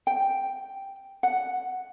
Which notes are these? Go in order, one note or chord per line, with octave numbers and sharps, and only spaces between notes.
G5
F#5